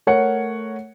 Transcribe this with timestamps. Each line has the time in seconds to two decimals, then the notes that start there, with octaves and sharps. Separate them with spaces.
0.07 A3 A#4 C#5 F#5 C#7